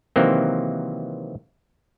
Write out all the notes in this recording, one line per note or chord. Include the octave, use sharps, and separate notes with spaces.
C3 D#3 E3 F#3 A#3 C4